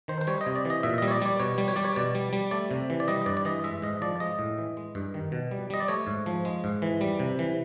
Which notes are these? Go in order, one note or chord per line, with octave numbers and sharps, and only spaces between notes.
D#3 C5
C5
G3 C#5
D#5
C3
D5
E3 D#5
A#2 E5
G3 D#5
C#5
D5
G3 D5
B2 C#5
G3
C#5
G3 D5
C#5
B2 D5
G3
G3
A3 D5
C3
E3
D5
G3 D#5
G2 D5
D5
E3 D#5
G#3 E5
G#2 D#5
F3 D5
G#3 D#5
A2
E3
G#3
G2
D#3
B2
G3
G3 D#5
D5
A3 C#5
G#2
F3
G#3
G#2
E3
G3
C3
E3